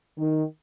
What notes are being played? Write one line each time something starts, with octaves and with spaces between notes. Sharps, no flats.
D#3